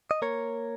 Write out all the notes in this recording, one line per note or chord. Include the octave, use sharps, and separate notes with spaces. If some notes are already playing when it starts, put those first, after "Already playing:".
D#5
A#3 A#4 C#5